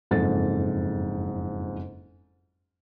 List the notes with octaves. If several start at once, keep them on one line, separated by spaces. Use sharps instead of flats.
F#1 F2 G#2 A4 A6